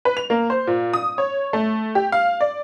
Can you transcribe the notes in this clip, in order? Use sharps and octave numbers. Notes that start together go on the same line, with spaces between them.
B4
F7
A#3
C5
A#2
D#6
C#5
A3
G4
F5
D5